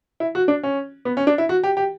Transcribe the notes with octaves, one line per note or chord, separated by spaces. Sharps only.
E4
F#4
D4
C#4
B3
C#4
D4
E4
F#4
G4
G4